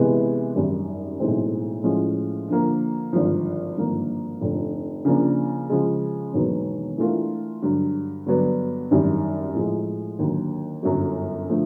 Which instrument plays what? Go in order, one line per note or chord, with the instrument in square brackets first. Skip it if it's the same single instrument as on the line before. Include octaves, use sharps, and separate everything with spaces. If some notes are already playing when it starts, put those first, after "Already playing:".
Already playing: [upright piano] C3 E3 G#3 B3
G#1 F#2 D#3 G3
B1 A2 E3 G#3 C4
A2 F3 G#3 C#4
D3 F3 A#3
G#1 G2 D3 F3
G#1 G2 D3 F3 A#3
F1 F2 D3
C#3 F3 A#3 D4
C#3 F3 G#3
E1 D#2 D#3 F#3 B3
E3 A3 D4 F4 A#4
G2 D3 F#3
G2 D3 F#3 B3 D4
G#1 F#2 D#3 G3
A2 F3 G#3
D#2 D3 F#3
G1 F#2 D3 F#3
D3 F3 A3